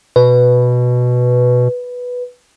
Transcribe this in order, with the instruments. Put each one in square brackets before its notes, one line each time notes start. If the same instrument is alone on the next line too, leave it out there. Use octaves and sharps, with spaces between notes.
[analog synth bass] B2 [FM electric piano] B4